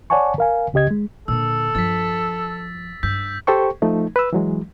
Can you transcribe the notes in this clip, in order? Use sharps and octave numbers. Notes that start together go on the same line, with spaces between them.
C#5 D5 F#5 G#5 A5 C#6
A#4 F5 G#5
C#2 C#3 G4 D#5 G#6
G#3
A#2 D3 A4 E6
G2 F3 A6 B6
G2 E6 G6 B6
G4 A4 C5 G5 C#6
F3 A3 D#4
B4 E6
E3 F#3 G#3